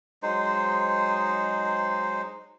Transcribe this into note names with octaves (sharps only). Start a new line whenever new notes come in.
F#3 G#3 D#4 C5